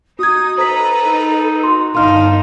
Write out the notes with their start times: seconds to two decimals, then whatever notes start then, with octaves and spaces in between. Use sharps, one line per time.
0.19 D#4 F#4 D#6 G#6
0.58 A4 B4 C5 D#5 A#5 B6
1.03 D#4
1.63 F#4 C6
1.95 G1 D#3 D4 D#4 F5 C6 F6